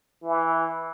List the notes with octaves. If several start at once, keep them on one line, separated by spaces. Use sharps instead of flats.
E3